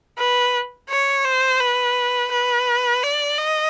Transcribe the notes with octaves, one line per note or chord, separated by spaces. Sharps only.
B4
C#5
C5
B4
B4
D5
D#5